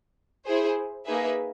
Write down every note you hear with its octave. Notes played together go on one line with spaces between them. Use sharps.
E4 G#4 C5
A#3 D#4 G#4 B4 E5